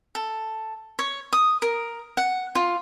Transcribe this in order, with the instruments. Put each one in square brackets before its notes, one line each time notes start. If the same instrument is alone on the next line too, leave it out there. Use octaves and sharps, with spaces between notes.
[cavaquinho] A4
C#5
D#6
A#4
F#5
F4